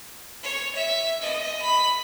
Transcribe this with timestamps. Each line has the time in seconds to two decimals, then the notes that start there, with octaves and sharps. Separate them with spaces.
0.43 C#5
0.76 E5
1.22 D#5
1.61 B5